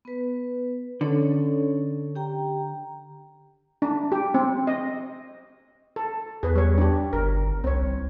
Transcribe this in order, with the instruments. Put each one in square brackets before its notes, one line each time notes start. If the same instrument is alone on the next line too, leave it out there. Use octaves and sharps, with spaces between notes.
[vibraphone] B3 B4
[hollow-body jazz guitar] D3 [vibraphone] C#4 A4 C#5
[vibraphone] G4 G5 A#5
[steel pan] D4
G4
C4
D#5
A4
[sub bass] E2 [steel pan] G#4 B4
[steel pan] G3 C#5
D4 G4
[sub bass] G1 [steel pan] A#4
[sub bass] C2 [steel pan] C4 C#5